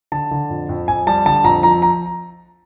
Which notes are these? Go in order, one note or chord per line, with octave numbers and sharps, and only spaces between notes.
D3 A5
D3
F2
F2
F2 G#5
G3 A5
D3 A5
F2 A#5
F3 A#5
A#5